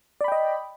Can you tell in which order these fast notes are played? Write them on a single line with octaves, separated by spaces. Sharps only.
D5 B5 G5 D#5